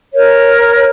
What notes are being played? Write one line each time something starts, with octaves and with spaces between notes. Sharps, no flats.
A#4 C#5